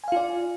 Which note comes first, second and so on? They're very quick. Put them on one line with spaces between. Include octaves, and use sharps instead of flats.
G#5 F5 F4 D5